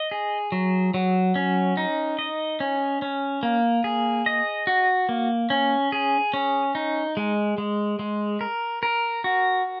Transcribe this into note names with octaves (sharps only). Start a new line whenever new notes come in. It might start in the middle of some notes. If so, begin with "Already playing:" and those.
Already playing: D#5
G#4
F#3
F#3
C#4
D#4
D#5
C#4
C#4
A#3
G#4
D#5
F#4
A#3
C#4
G#4
C#4
D#4
G#3
G#3
G#3
A#4
A#4
F#4